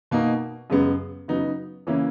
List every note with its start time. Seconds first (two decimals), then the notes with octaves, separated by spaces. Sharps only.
0.11 B2 A#3 D#4
0.70 F#2 C#3 G#3 B3
1.28 C#3 F#3 B3 D#4
1.87 C#3 E3 A#3 C#4 E4